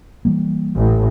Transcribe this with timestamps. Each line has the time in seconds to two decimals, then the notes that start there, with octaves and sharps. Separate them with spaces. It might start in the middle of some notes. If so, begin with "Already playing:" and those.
0.25 E3 G3 A#3
0.75 A1 A2